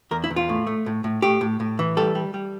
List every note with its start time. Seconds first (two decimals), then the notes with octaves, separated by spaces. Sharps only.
0.11 E2 A#4
0.24 E4
0.30 E2
0.36 F4
0.49 A2
0.67 A3
0.86 A2
1.04 A2
1.22 A2 G4
1.41 A2
1.60 A2
1.79 E3
1.97 G3 A4
2.15 G3
2.34 G3